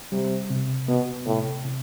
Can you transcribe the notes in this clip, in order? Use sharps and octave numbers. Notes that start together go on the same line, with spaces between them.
C3 G3
C3
B2 B3
A2 C3
C3